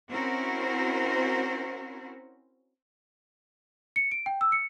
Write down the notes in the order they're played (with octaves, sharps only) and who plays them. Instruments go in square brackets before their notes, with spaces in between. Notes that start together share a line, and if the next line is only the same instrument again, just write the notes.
[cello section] C4 C#4 E4 F#4 A#4 C5
[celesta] C#7
D7
G5
E6
C#7